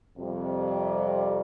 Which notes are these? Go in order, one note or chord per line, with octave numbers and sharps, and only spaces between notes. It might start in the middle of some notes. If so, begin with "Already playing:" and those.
F2 C3 G3